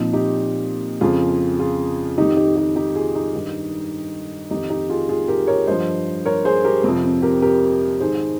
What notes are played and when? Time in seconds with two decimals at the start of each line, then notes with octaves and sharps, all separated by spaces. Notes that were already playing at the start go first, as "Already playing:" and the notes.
Already playing: A#2 F3 C4 D#4
0.13 D#4 G4
1.01 F2 C#3 F3 F4 G#4
1.59 F4 G#4
2.18 F2 D#3 D#4 G4
2.37 D#4 G4
2.56 D#4 G4
2.76 D#4 G4
2.95 F4 G#4
3.15 D#4 G4
3.34 G2 D#3
4.51 F2 D#3 D#4 G4
4.70 D#4 G4
4.90 F4 G#4
5.09 F4 G#4
5.28 G4 A#4
5.47 A#4 C#5
5.67 G2 F3 C5 D#5
6.25 A#4 C#5
6.45 G#4 C5
6.64 G4 A#4
6.84 F2 C3 F3 C4
7.04 C4
7.22 G4 A#4
7.42 G4 A#4
8.00 G#2 D#3 G#4 C5